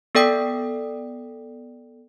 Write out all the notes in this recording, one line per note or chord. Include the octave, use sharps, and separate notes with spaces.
B3 A4 D5 G5 D#6 B6